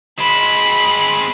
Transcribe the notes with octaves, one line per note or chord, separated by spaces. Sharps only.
G#3 C4 B5